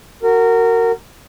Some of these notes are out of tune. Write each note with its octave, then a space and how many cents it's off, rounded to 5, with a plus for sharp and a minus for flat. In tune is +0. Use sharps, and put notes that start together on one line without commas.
F#4 +10 A#4 -20